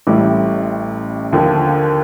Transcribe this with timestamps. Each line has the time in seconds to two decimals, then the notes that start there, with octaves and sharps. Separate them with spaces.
0.07 A1 A2 G3
1.33 D#2 D3 F3